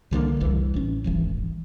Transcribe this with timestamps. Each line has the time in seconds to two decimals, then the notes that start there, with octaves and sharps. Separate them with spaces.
0.11 C2 D3 F3 A#3
0.40 F1 C2 E3
0.74 A1 C#4
1.04 D#1 G#1 E3